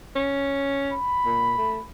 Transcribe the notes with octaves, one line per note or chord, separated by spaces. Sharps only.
C#4
B5
A#2
A3